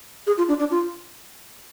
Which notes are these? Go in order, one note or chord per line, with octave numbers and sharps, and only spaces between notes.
G#4
F4
D4
D4
F4